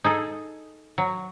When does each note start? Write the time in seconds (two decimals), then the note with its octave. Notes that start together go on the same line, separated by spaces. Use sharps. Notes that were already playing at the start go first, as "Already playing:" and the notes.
0.04 D#4 G#4 A4
0.98 F#3